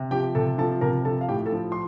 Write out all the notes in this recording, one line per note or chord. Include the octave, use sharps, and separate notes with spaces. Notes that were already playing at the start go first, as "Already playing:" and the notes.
Already playing: C3
F3 G4 G5
C3 A4 A5
F3 A4 A5
C3 A#4 A#5
F3 A4 A5
F5
A2 G4 G5
A4 A5
F3
C6